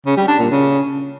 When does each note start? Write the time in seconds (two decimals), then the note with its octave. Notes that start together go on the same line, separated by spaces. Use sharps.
0.06 C#3
0.17 G3
0.28 D4
0.39 A#2
0.50 C#3